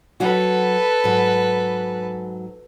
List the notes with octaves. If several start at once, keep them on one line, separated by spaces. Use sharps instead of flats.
F#3 F#4 A4 B4
G#2 F#3